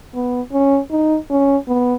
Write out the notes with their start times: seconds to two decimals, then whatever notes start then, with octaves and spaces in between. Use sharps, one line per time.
0.14 B3
0.52 C#4
0.90 D#4
1.30 C#4
1.68 B3